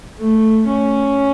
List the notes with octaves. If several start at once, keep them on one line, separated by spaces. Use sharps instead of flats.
A3
C#4